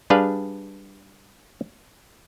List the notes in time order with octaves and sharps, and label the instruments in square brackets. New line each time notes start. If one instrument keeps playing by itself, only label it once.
[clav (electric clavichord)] G3 D4 G#4 B4 F5